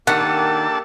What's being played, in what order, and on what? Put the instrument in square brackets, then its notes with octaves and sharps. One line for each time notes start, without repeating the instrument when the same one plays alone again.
[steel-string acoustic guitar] D#3 [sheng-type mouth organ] A#3 G4 [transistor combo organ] D4 A4 A5 [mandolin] F#5